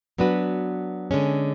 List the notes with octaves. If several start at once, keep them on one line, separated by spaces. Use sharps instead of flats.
F#3 B3 D4 F#4 B4
D3 G#3 C#4